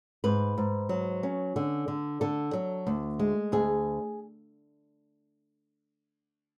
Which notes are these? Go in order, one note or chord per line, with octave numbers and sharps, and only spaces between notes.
G#2 B4
G#2
F#3
C#4
D3
D3
D3 A4
F#3
D2
G#3
D2 G#4